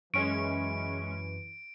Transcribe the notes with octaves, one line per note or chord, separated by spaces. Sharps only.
F#2 E3 G#3 C#4 C#6 D7